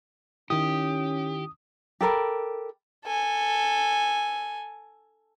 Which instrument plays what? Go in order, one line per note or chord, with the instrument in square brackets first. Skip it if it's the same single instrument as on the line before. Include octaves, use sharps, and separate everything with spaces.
[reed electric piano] D#3 E4 [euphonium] C#4 [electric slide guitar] G4 [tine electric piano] D#6
[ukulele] G4 A4 A#4 B5
[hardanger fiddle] A4 G#5